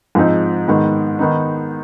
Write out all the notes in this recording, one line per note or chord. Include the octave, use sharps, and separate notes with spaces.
G#2 F3 G#3 C4 D#4
G#2 D#3 B3
D#3 B3 D#4